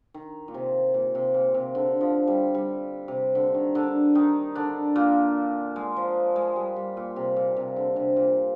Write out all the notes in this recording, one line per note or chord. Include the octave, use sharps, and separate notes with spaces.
D#3
A#2
C3
A#2
C3
A#2
C3
D3
F3
G3
G3
C3
D3
D#3
D3 D4
D#3 D#4
D3 D4
A#2 A#3
G#3
F3
G#3
G3
G3
A#2
C3
A#2
C3
D3
C3
A#2